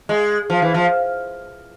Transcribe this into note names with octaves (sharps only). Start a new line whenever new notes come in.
G#3
F3
E3
F3